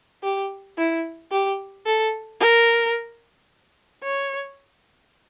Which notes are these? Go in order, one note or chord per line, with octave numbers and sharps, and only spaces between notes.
G4
E4
G4
A4
A#4
C#5